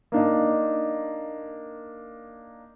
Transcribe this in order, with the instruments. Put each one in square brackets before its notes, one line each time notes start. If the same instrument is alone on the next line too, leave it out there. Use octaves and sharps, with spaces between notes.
[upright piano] A#3 D4 D#4